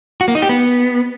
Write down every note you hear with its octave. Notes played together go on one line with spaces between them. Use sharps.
F#4
A#3
D#4
G4
B3